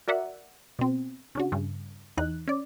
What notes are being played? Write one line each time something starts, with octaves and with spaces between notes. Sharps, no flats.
F#4 A#4 D5 E5 F#5
B2 C4
C#3 D4 F#4
G2 C#3
E2 E3 D#4 F#6
C#4 D5